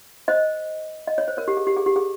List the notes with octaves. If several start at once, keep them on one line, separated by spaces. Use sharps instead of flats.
C5 D#5
D#5
C#5
C5
A#4 C#5
G4
G#4
G4
G#4
G4
G#4